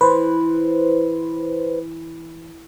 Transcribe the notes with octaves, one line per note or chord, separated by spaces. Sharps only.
E3 B4 C5